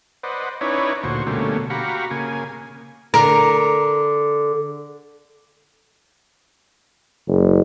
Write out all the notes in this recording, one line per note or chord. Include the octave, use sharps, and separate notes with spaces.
B4 C5 D5 D#5 F#5
C#4 D#4 E4 B4 C#5 D5
D2 A#2 F#4 C5 C#6
B2 D3 G3 A3 A#3 C#4
F#4 G4 F5 A#5 B5 C#6
C#3 A#3 G#5
D3 A#4
F#1